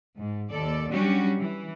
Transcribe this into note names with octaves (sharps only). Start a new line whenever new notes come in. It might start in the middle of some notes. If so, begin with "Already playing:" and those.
G#2
D#2 A4 D5
F#3 G3 C#4 D4 F#4 G4
E3